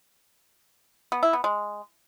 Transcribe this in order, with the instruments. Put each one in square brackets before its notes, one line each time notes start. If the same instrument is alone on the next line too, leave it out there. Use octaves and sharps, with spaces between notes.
[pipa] B3
E4
B3
G#3